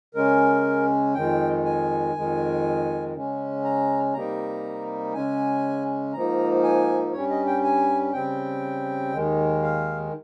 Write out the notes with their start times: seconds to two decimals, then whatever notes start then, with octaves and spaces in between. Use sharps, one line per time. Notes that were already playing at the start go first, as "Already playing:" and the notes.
0.14 C#3 G#3 C#4 A#4
1.14 F2 D#3 G#3 G5
1.64 G#5
2.14 F2 D#3 G#3
3.14 C#3 G#3 C#4
3.64 A#5
4.13 C3 G3 A#3 D#4 A#5
5.13 C#3 G#3 C#4 G#5
6.13 G#2 F3 A#3 D#4 A#5
6.63 G#5
7.13 G2 G3 C#4 C#5
7.30 D#5
7.46 G5
7.63 G#5
8.13 C#3 G3 C4 G5
9.13 D#2 D#3 G#3
9.63 F5